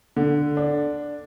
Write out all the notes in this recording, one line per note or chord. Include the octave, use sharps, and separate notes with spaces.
D3
D4